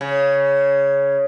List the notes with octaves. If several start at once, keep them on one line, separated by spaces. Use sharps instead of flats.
C#3